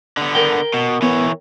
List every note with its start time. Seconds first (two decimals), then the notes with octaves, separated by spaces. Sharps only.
0.17 D3 B3
0.35 A#4 G5
0.74 B2
1.02 E3 B3 C#5